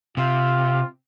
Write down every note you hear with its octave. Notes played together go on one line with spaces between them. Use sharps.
C3 F4